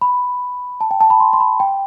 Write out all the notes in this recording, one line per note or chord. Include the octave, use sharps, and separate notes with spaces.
B5
A5
G5
A5
B5
C6
C6
B5
G5